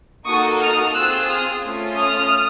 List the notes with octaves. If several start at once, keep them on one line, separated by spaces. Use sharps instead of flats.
A#3 D#4 F#4 A4 C#6 D#6
D#6 F6
C4 F4 G#4 E6 F#6
D#6 F6
A3 C#4 F4
D#6 F6